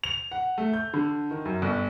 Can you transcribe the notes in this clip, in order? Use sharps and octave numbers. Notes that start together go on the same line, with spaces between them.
F7
F#5
A3
G6
D3
D#3
F#2
G1